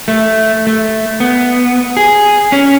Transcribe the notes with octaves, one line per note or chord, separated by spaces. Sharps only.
A3
A3
B3
G#4
C#4